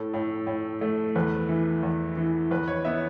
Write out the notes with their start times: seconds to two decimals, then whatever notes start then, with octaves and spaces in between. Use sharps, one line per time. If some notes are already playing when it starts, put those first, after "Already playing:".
Already playing: A2 A4
0.14 A2
0.47 A2
0.81 A3
1.15 E2 B4
1.49 E3
1.83 E2
2.17 E3
2.51 E2 B4
2.68 C#5
2.85 B3 E5